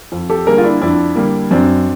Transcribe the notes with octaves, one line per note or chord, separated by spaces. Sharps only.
F2
G4 A4
D3 G3 A#3 G#4 A#4
F4
D4 E4
F2 D4 E4
D3 G3 A#3
F#2 C4 D4